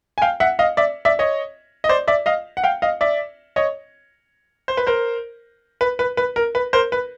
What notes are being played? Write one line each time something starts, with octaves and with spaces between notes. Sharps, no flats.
G#5
F5 G5
E5 F#5
D#5 F5
D5 E5
D5 E5
C#5 D#5
D#5
C5 D5
D5 E5
D#5 F5
F#5
F5 G5
D#5 F5
D5 E5
C#5 D#5
C5
B4
A#4 C5
B4
B4
B4
A#4
B4
A#4 C5
B4